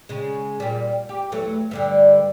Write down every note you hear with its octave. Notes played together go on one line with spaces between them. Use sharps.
C#3 G#3
A#2 G3
G4
E2 F#3 A3
G2 D3 G3